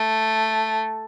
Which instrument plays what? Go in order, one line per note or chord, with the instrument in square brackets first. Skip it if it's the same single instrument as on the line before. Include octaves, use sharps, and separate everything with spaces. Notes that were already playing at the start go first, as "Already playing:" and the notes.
Already playing: [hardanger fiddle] A3